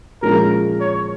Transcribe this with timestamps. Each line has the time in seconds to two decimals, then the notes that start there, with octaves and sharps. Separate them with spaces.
0.22 A#2 F3 G#3 C#4 A#4
0.80 C#5